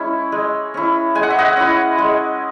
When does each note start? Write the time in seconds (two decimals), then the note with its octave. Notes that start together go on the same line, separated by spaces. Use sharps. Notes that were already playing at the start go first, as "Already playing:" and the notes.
Already playing: G#3 C#4 E4 C#6
0.32 G#3
0.74 C#4 E4
1.15 G#3 G#5
1.23 F#5
1.30 E5
1.38 D#5 F#5
1.56 C#4 E4
1.98 G#3